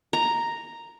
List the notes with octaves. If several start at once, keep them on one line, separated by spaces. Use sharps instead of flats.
A#5